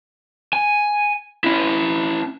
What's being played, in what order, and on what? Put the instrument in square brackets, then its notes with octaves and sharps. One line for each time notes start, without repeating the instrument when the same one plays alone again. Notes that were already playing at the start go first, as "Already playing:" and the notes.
[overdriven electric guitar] G#5
C#4 E4